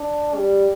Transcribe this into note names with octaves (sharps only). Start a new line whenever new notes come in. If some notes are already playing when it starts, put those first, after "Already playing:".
Already playing: D4
G3